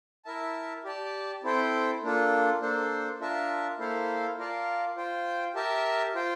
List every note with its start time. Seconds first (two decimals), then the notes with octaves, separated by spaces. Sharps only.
0.25 E4 A#4 E5 A5
0.85 G4 D5 A5
1.44 C4 E4 A4 C5 G5
2.03 A#3 D4 F4 A4
2.61 A#3 D4 A4 C5
3.20 D4 F4 A#4 E5 A5
3.79 A#3 E4 A4 C5 F5
4.38 F4 A#4 D5 F5 A5
4.96 F4 C5 G5
5.55 G4 A#4 E5 A5
6.15 F4 C5 G5